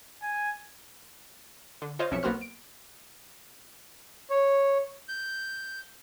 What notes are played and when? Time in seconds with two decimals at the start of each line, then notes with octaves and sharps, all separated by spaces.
0.22 G#5
1.82 D3
1.99 F4 C5 C#5 D#5 F5
2.11 B1 F2 C#4 E5 C#7
2.23 B1 A#3 B3 F#4 C5 F6
2.41 D7
4.30 C#5
5.09 G6